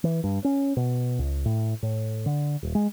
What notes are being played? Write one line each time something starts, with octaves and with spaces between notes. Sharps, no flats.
E3
G2
C#4
B2
C#2
A2
A2
D3
D#1
G#3